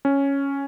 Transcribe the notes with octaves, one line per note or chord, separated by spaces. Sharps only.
C#4